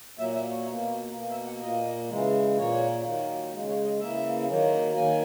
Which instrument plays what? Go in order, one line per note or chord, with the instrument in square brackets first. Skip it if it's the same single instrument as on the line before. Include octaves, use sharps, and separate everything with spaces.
[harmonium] A#2 F#3 A#3 E5
E5
C#5
B2 A#3
B2 A#3
E5
F#5
A#2 A#3 D#5
C#3 E3 G#3
A#2 A#3 C#5
D#3 F#3 A#3
C#3 G#3
C#5
D#5
C#3 E3 A#3 E5
D#3 F#3 A#3
D#3 F#3 A#3 G#5